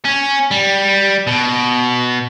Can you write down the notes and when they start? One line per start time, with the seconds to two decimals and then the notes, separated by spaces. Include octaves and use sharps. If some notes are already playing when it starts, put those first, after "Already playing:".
0.05 C#4
0.51 G3
1.27 B2